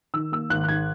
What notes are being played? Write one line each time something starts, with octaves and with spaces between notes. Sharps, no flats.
D#3 E6
A#3 E6
G#1 F#6
F#6
G#2 G#6